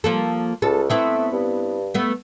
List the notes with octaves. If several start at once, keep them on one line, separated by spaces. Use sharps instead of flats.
F3 A#3 A4
C#2 A4
A3 B3 C4 E4
G2
A3 B3